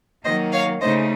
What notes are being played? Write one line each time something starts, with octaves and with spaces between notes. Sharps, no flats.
D#3 F#3 A#3 C5 D#5
C#5 F5
C#3 A3 D#4 C5 D#5